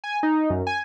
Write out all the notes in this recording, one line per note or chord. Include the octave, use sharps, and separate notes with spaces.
G#5
D#4
F#2
G#5